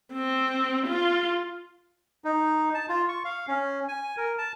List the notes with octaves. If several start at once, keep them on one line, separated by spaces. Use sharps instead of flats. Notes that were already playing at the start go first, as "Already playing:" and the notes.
C4
F4
D#4
A5
F4
C#6
F5
C#4
G#5
A#4
A5